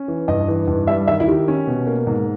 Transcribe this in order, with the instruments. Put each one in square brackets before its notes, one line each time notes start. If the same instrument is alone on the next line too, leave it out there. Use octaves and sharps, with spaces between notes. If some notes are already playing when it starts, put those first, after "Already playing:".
Already playing: [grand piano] C#4
E3
[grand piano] G2 [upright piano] D#5
[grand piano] E3
G2
[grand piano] G3 [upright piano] E5
[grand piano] D#3 [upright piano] E5
[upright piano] E4
[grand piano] D#3 [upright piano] G4
[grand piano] C#4
B2
A#3
G#2